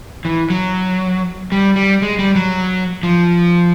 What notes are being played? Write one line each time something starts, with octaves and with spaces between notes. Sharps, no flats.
E3
F#3
G3
G3
G#3
G3
F#3
F3